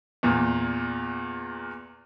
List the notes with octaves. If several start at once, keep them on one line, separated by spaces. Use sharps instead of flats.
E2 A#2